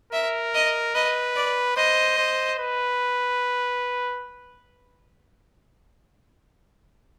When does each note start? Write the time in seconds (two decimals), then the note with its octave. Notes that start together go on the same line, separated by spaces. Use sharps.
0.13 A#4 E5
0.55 D#5
0.94 B4 D#5
1.36 D5
1.77 C5 D#5
2.18 C5
2.59 B4